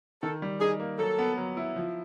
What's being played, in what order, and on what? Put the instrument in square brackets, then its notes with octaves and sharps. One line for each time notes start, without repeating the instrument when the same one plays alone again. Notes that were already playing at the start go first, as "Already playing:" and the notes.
[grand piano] D#3 [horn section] A4
[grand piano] G3
[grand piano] D#4 [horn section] G#4
[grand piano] A#3
[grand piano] F#3 [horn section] A4
[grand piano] B3
F#3
E4
F3